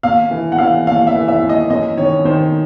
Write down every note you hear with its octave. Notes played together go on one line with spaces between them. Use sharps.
D#2 F5
E3
F#5
E3 F5
D#2 F5
E5
E3
E5
D#2
D#5
F#2 D#5
D#3 C#5
D#3 C5